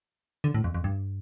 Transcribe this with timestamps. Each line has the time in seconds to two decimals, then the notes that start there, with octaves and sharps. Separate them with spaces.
0.44 D3
0.54 A2
0.64 F2
0.74 F2
0.84 G2